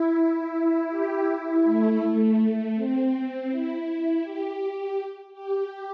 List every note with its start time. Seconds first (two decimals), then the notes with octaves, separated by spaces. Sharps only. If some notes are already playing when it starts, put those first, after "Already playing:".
Already playing: E4
0.17 E4
0.90 G4
1.27 E4
1.64 A3
2.75 C4
3.48 E4
4.23 G4
5.34 G4